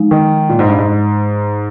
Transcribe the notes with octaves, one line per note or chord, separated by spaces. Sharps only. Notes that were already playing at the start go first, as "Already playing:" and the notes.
Already playing: F3 G#3 D#4
D#3
A#2
G#2
G2
G#2